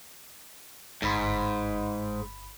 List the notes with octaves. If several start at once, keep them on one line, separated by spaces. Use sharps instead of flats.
G1 G#2 B5